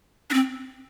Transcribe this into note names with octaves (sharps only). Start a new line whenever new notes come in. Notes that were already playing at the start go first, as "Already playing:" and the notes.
D4
C4